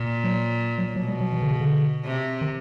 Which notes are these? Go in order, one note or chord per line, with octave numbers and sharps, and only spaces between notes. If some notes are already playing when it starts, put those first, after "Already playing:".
Already playing: A#2
F#3
F#3
B2 F#3
G3
F#3
E3
D3
C#3
D3
C3
D#3